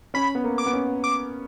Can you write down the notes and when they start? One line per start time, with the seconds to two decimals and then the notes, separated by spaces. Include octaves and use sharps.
0.14 C#4 B5
0.35 B3
0.44 A#3
0.58 D6
0.66 B3
0.73 C#4
1.04 D6